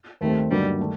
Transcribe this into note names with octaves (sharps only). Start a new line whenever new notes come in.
D#2 D#3 G3 A3 C4
G2 D3 F#3 G3 A#3 D#4
D#3 A3